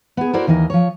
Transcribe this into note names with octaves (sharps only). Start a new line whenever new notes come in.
B3 G#4
E4 F#4 A4 A#4 C5 D5
D#2 E3 D#4 A#4
F3 C#5